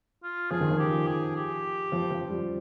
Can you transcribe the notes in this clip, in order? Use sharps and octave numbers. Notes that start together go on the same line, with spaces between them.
F4
F3 G#4
D#3
F3
G4
G#4
G4
F3
F3
G3